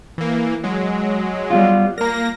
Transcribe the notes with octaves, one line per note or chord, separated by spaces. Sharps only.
E3 A#3
F#3 G#3
G3 B3 F4
A#3 A#4 A#5 A#6